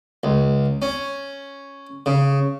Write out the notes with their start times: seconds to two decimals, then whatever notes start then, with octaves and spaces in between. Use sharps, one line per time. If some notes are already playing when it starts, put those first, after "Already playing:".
0.24 C#2
0.82 C#4
2.06 C#3